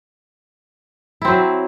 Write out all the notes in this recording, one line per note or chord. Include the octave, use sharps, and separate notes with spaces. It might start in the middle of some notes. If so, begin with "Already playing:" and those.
F#3 C4 E4